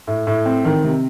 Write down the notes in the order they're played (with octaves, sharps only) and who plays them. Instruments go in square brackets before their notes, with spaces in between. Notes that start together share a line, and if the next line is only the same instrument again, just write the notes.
[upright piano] A2
A2
C4
D#3
C3